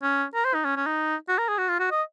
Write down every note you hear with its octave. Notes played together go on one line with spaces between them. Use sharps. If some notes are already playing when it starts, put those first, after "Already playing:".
C#4
A#4
C5
D#4
C#4
C#4
D#4
F#4
A#4
G#4
F#4
F4
F#4
D#5